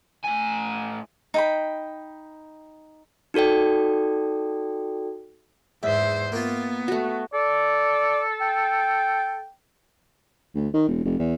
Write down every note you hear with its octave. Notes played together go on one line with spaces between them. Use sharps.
A2 G#5
D#4 G5 B5
D#4 F#4 A4 D5 G5
E2 G#2 C5 E5
A#3 B3 F4
A3 F#4
A4 D5
G5
D2
D#3
E1
F1
E2